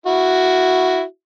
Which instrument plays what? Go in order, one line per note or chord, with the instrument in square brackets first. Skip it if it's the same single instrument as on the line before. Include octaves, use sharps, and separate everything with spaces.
[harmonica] E4 F#4